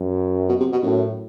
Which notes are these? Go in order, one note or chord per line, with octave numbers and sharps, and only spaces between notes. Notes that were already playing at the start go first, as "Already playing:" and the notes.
Already playing: F#2
B2
C3
B2
F#2 A2